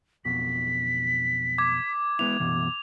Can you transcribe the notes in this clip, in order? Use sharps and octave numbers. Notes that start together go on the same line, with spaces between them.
B1 F2 B2 B6
D6 G#6
G#3 B3 E4 F7
F#2 B2 E3